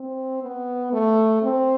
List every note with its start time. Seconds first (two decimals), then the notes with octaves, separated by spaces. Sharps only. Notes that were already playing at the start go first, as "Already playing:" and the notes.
Already playing: C4
0.43 B3
0.93 A3
1.43 C4